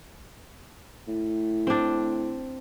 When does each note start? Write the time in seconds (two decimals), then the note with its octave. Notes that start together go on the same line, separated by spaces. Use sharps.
1.08 A2
1.67 C4 D4